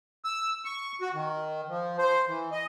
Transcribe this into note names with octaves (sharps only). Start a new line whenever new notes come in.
E6
C#6
F#4
D#3
F3
C5
E3
D#5